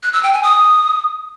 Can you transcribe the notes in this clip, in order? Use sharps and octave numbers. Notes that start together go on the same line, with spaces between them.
F#6
E6
G5
G#5
D#6